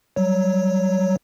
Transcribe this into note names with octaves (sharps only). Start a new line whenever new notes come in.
F#3 G3 C#5